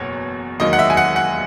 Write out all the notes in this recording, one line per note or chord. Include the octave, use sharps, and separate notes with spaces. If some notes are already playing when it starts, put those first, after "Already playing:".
Already playing: F#1 E2 B2 C#5
E1 D#2 D#3 F#3 D#5
F#5
E5
G#5
F#5
F#5